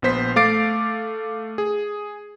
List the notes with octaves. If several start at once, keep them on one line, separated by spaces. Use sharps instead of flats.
A#1 B3 C5 B6
A3 F5 D6 A6 C7 D7
G#4